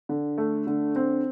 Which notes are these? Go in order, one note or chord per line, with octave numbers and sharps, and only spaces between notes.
D3
A3
D3
C4